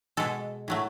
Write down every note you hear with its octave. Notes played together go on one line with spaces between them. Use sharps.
B2 G#3 A4
A2 F#3 A3